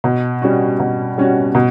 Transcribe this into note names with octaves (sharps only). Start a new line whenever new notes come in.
B2
G3 C#4 F#4
B2
G3 C#4 F#4
B2